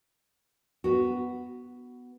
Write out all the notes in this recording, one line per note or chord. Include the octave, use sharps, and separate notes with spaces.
B3 F#4